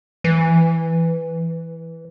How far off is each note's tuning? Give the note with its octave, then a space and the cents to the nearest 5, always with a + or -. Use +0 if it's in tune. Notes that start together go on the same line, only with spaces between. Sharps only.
E3 +0